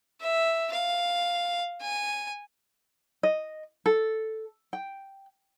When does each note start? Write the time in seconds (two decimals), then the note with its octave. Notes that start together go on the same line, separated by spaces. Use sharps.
0.21 E5
0.72 F5
1.81 G#5
3.23 D#5
3.86 A4
4.73 G5